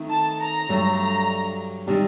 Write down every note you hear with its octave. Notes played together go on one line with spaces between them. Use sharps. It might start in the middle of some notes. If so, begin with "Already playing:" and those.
Already playing: D#3 A3 C4
A5
A#5
G2 F#3 A3 D4
C3 D#3 G3 D4 G4